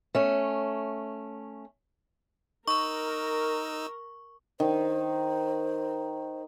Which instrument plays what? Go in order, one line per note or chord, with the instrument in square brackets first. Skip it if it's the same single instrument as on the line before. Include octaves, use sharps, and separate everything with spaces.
[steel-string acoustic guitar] A3 C#4
[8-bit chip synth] D#4 E6 [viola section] A#4 [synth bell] C#6
[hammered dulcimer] D#3 [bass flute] C5